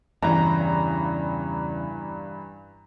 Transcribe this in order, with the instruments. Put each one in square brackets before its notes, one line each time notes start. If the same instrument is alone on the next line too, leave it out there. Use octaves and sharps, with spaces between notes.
[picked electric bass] E2 C#3 [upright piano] G2 E3 [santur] A#5